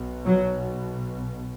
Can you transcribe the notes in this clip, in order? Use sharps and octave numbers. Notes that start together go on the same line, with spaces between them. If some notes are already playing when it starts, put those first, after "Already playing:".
Already playing: B1 B2
F#3